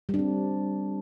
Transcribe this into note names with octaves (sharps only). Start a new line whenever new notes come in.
G3 C4 D4